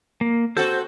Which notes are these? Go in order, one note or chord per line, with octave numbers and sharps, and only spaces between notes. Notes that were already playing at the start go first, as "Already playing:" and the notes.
A#3
C4 F#4 A4 C5 G6